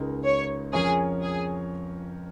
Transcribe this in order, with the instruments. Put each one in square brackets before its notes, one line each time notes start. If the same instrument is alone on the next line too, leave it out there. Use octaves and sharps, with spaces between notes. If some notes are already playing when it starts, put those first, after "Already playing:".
Already playing: [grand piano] C#2 C#3 G#3 D#4 A#4
[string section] C#5
[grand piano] F2 F3 C#4 A#4 C#5 [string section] G#4
[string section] G#4